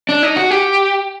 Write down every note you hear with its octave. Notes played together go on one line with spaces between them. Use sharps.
D4
D#4
F#4
G4